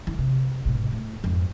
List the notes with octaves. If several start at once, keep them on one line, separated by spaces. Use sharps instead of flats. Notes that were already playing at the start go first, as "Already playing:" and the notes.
E3
C3
G#2 B2
A2
F2 G#2